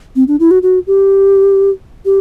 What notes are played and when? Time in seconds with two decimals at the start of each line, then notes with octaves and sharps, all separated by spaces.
0.16 C4
0.28 D4
0.40 E4
0.51 F#4
0.63 F#4
0.87 G4
2.05 G4